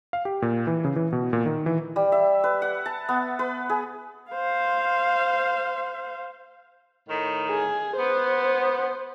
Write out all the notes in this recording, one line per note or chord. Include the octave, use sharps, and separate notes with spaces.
F5
G4
A#2
E3
C#3
E3
B2
A#2
D#3
E3
G3
E5
B4
F#5
A5
B3
B4
G#4
C5 F5
A2 D#3
G#4
B3 C5